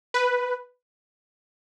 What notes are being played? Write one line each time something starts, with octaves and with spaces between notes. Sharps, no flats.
B4